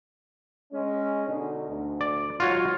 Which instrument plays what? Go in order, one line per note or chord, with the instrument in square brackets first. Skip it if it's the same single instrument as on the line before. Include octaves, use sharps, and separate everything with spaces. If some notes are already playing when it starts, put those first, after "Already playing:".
[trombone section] G#3 C#4
B2 D3 D#4
D2
[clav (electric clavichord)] D5
[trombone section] G#2 F#3 [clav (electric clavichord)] F4 F#4 C#5